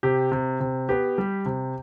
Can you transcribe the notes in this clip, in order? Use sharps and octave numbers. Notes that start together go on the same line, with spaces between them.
C3 G4
C3
C3
B3 G4
G3
C3